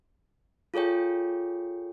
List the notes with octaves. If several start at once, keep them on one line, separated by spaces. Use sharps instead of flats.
F4 G#4 A4 C#5 G5